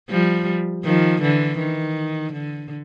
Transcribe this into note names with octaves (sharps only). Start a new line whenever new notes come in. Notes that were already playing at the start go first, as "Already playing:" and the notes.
F3 G3
D#3 F3
D3 E3
D#3
D3